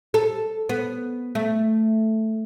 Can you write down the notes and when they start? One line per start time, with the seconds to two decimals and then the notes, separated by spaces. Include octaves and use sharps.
0.14 A4
0.69 B3
1.35 A3